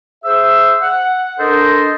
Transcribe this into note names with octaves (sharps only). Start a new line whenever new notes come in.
G#4 C5 E5 E6
F#5
D4 A4 A#4 C5 D#5